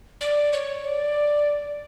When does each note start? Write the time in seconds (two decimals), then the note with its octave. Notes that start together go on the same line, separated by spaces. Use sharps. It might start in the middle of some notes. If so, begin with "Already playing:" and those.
0.21 D5
0.53 C#5
0.84 D5